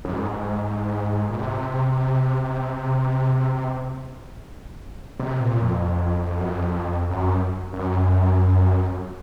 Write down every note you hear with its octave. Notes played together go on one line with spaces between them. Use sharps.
F#2
G#2
A#2
C3
C3
A#2
F2
F#2
F2
F#2
F#2